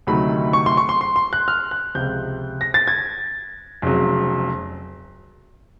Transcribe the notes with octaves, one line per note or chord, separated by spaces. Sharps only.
D2 C3 D#3 F#3 A3 B5
C#6
C6
C#6
C6
C6
C6
F#6
F6
F#6
C#2 C3 F3 G6
A#6
A6
G#6
F1 F2 C#3 F#3